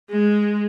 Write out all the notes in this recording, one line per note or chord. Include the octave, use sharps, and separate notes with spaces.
G#3